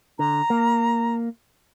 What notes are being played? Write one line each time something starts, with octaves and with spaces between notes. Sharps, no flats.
D3 A#5
A#3